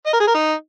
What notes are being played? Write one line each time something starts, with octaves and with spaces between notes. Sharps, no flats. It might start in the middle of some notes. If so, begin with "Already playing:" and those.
D#5
A#4
G#4
A#4
D#4